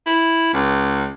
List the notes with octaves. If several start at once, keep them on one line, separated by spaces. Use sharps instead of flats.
E4
C#2